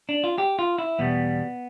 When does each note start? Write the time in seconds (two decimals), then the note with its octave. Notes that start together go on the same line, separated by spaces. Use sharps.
0.09 D4
0.24 F4
0.38 G4
0.59 F4
0.78 E4
0.99 E2 B2 G3 B3